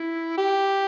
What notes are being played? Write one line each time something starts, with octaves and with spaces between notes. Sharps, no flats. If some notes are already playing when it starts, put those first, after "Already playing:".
Already playing: E4
G4